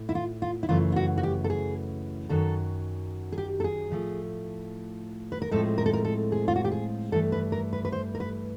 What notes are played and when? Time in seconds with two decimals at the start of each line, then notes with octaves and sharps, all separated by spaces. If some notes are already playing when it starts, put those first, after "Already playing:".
Already playing: A2 A3
0.09 E4
0.15 F4
0.42 F4
0.63 E4
0.69 F#2 C#3 E3 A3 F4
0.92 F4
0.96 F#4
1.18 F#4
1.23 G4
1.44 A4
1.50 G#4
2.29 F#2 D#3 F#3 A4
3.32 G#4
3.38 G4
3.60 A4
3.64 G#4
3.90 A2 F3 A3
5.32 B4
5.42 A#4
5.51 A2 F3 G#3 C4 A4
5.78 A#4
5.86 A4
5.93 A#4
6.05 A4
6.32 G#4
6.48 F4
6.56 F#4
6.65 G4
6.72 G#4
7.12 G2 E3 A3 A4
7.32 B4
7.52 A#4
7.73 B4
7.85 B4
7.92 C5
8.15 A#4
8.20 B4